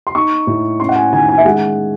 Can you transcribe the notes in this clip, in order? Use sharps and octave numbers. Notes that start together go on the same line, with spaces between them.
C6
D#4 C#6
A2
C#4 C6
F#5
G#5
D#3 G#5
G#5
E5
G#3 F#5